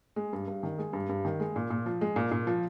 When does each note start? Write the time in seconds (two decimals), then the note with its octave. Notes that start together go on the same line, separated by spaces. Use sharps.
0.16 G#3
0.33 G2
0.48 G2
0.63 D#3
0.78 G#3
0.93 G2
1.09 G2
1.25 D#3
1.40 G#3
1.56 A#2
1.70 A#2
1.86 F3
2.01 G#3
2.16 A#2
2.31 A#2
2.47 F3